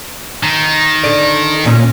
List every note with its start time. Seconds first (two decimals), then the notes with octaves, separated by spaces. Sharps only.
0.43 D#3
1.04 D3 D5
1.64 D#2 A#2 C#4